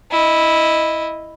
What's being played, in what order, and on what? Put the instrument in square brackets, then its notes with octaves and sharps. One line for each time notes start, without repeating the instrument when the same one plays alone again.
[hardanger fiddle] E4 D#5